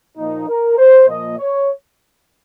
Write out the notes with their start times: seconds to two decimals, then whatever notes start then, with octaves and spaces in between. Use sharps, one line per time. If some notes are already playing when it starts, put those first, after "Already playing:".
0.16 A#2 F3 A#3 D#4
0.47 A#4
0.77 C5
1.07 A#2 F3 A#3 D#5
1.38 C#5